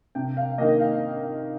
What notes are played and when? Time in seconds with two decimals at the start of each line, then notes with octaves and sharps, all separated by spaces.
0.15 C3 G5
0.37 F5
0.58 D#3 A#3 D#5
0.80 F5